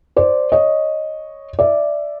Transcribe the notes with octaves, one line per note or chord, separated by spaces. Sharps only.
C5 D5
C#5 D#5
D5 E5